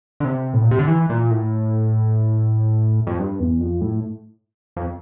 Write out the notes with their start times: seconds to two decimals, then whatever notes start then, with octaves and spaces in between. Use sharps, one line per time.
0.20 D3
0.25 C3
0.54 A2
0.63 A#2
0.71 C3
0.79 D3
0.87 E3
1.10 A#2
1.31 A2
3.07 F2
3.19 G2
3.40 E2
3.60 F2
3.81 A2
4.76 F2